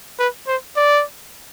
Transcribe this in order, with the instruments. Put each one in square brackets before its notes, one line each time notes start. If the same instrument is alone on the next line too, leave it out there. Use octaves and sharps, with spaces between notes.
[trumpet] B4
C5
D5